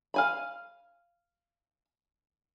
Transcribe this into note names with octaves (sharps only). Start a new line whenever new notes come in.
F5 G#5 B5